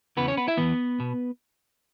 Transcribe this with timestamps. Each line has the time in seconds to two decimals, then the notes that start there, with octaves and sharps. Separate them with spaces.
0.17 E2 C#3 E3 B3 B4
0.28 C#4 C#5
0.37 B3 B4
0.48 E4 E5
0.57 E2 C#3 E3 B3 B4
1.00 B2